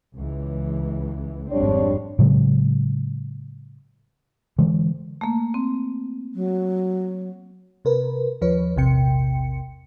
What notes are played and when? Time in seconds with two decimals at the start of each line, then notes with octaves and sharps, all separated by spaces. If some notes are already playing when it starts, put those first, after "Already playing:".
0.14 C#2 E3
1.50 G#1 F2 G3 C4 D4 C#5
2.19 A2 C#3 F#3 G#3
4.59 D3 E3 G#3
5.21 A3 A#3
5.54 C4
6.35 F#3
7.85 C3 A#4 B4
8.41 D#2 F3 B4 C#5
8.76 A#1 E2 C3 G5 C#7